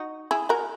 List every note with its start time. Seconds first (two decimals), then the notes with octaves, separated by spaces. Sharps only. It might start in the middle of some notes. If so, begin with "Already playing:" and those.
Already playing: D#4 F#4
0.31 E4 G#4
0.49 F#4 A#4